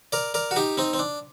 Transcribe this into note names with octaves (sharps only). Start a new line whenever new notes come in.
A#4 D5
A#4 D5
F#4
D#4 G4
C4 D#4
C4
D4